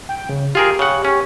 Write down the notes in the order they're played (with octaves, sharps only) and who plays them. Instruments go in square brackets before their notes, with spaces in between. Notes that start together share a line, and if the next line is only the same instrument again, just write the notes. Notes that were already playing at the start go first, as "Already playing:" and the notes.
[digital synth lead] G5
C#3
[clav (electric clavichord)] F4 G#4 A#4 [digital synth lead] G4
[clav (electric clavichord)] C#3 F#5
C#4